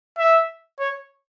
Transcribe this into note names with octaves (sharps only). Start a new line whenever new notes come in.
E5
C#5